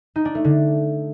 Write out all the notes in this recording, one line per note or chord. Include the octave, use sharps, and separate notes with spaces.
D#4
D4
A3
D3